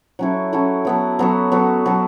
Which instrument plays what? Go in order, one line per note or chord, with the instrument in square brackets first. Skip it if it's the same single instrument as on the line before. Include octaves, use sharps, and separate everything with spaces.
[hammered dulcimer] F#3 C#4 E4 A4
F#3 C#4 E4 A4
F#3 B3 A4
F#3 B3 A4
F#3 B3 A4
F#3 B3 A4